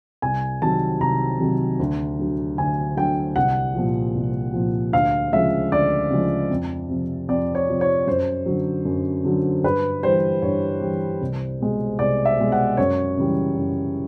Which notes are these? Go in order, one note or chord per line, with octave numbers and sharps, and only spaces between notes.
C2 G#5
C3 D#3 F#3 A5
C2 A#5
C3 D#3 F#3
D2
D3 F#3
D2 G#5
D3 F#3 G5
C2 F#5
A#2 F3
C2
A#2 F3
D2 F5
C#3 F3 G#3 E5
D2 D5
C#3 F3 G#3
F2
C3 F3
F2 D5
C#5
C3 F3
C#5
F#2 C5
D3 F#3
F#2
D3 F#3
G2 B4
E3 G3 C5
G2 C#5
E3 G3
C2
B2 G#3
C2 D5
E5
B2 G#3
F#5
F#2 C#5
C#3 E3 G3
F#2